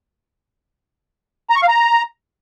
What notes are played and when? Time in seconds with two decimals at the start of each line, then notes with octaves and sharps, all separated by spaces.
1.50 A#5
1.56 C#6
1.62 F5
1.68 A#5